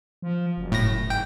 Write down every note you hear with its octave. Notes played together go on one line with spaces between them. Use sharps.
F3
F#1
A2 A#6
G#2 G5